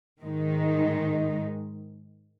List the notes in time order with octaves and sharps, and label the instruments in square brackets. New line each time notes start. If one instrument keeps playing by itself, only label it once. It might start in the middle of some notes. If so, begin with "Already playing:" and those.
[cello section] G#2 D#3 G#3 D#4